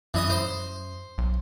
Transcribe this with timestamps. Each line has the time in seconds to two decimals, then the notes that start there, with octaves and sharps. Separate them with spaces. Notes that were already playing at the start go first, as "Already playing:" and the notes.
0.14 F#2 E3 D#5 D#6
0.30 C5 C6
1.18 B1